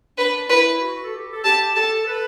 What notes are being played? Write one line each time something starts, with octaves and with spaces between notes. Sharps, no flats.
D4 B4
E4 B4
F#4
A4
G4
A4
G4 A5
A4 A5
B4